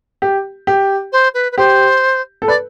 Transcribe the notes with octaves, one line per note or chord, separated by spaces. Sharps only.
G4
G4
C5
B4
B4
G4 C5
A4
B4 D5